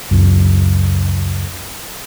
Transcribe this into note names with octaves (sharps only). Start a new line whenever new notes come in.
C#2 F#2